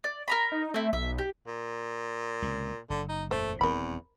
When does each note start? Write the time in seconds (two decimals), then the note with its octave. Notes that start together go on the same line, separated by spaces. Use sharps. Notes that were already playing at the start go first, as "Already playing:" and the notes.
0.04 D5
0.28 A#4 A#5 B5
0.52 D#4
0.74 A3 C4 E4
0.93 B1 E5
1.18 G4
1.47 A#2
2.42 C#2 C3
2.90 F#1 D3
3.09 D#4
3.31 F#1 E2 A#2 A3 C5
3.61 D#1 E2 C4 A#4 B5